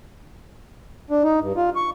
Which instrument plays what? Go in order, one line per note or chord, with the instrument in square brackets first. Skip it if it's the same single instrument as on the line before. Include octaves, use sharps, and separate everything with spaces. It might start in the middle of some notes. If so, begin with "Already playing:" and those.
[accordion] D4
D#4
G2
F4
C#6